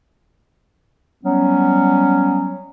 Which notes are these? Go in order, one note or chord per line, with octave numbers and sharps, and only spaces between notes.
F#3 G3 B3 C#4